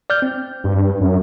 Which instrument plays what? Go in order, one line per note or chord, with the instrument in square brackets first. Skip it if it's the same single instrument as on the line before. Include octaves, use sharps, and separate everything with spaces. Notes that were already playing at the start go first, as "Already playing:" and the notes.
[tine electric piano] D5 F6 G6
C4
[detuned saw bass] G2
F#2